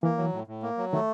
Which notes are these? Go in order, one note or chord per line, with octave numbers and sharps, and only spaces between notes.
E3 A#3
F#3
A2
A2
A#3
F#3
D#3 A3